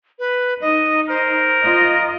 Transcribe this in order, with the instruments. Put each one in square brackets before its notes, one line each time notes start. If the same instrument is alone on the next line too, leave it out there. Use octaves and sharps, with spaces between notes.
[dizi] B4
[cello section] D#4 [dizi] D#5
[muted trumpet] A#4 [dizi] C5
[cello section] F4 D#5